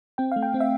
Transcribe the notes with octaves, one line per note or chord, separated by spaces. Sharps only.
C4 G5
A3 F5
G5
C4
E5